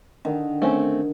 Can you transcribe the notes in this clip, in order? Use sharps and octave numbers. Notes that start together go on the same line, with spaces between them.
D3 D#3
A3 C4 C#4